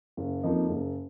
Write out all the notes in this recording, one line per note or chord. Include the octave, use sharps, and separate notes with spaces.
F#1
F2 F3 A#3 D#4
F#1